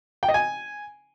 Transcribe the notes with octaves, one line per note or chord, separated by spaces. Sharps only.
G5
D#5
G#5